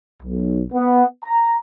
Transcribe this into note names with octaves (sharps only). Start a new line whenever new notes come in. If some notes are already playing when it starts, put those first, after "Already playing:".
B1
B3
A#5